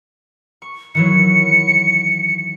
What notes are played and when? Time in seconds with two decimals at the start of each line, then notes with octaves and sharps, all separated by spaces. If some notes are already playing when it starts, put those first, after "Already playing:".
0.62 C#6
0.95 D#3 E3 F#3 C#7